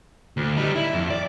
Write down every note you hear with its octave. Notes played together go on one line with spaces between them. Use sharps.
D2
G3 D#4
E4
F2
D5